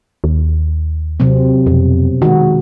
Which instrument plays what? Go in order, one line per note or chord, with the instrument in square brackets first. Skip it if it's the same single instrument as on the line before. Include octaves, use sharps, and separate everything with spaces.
[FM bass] D#2
[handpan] C3 F#3 C4
[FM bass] F2 [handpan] B2
[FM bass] D#3 [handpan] G#3 F#4